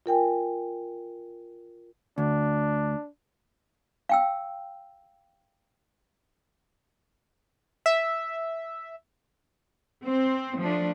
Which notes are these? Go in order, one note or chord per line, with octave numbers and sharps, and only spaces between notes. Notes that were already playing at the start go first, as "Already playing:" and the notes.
F4 A#4 G5 G#5
D2 D4
F5 G5 E6
E5
C4 C5
F3 A3 D4